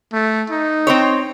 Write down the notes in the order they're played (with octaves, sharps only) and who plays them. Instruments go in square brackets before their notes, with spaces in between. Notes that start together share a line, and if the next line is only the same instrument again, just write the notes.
[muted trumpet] A3
D#4
[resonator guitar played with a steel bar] C4 C5 C#5